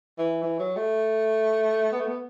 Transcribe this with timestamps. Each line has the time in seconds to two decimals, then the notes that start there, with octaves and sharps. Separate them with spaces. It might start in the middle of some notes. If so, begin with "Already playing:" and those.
0.18 E3
0.43 E3
0.59 F#3
0.76 A3
1.92 B3
1.99 A3
2.07 B3